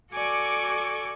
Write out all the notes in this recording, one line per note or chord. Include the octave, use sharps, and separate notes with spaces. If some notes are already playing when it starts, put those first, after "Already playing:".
F#4 A4 D5 G#5 C#6 D6